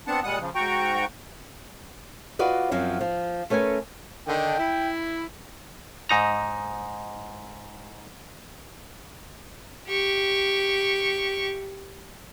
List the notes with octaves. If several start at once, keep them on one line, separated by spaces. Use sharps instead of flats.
B3 C4 D4 F#5 A5
A#2 G3 G#3 F#5 D#6 F#6
C#3 F3
G#2 F#4 G5 A#5 C#6
F4 F#4 B4 D5 D#5
F#2 F3 F#3 C4
F3
A3 C#4 A#4 B4 G#5
D3 D#3 D4 G5
E4
G#2 D#4 A#5
G4 C#6